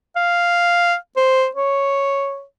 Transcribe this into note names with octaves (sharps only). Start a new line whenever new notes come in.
F5
C5
C#5